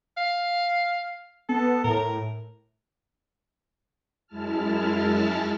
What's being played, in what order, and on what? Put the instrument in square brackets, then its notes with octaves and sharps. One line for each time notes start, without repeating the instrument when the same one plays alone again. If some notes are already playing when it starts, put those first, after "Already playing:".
[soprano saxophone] F5
[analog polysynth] B3 [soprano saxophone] A4
[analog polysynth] A2 [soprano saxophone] A#4
[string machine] F#2 G#3 E4 A5 F6